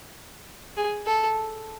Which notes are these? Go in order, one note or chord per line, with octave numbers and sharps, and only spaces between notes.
G#4
A4